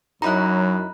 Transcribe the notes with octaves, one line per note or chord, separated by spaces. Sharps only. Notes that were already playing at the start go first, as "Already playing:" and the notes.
F#2 F#3 D#4 E4 A#5 B5 F#6